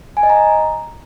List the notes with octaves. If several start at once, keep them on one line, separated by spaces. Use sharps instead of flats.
G#5
D#5
A#5